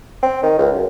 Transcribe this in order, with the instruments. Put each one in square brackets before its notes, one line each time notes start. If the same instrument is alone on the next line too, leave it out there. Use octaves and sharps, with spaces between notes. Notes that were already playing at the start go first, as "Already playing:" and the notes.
[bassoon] C4
D#3
C#2
F#2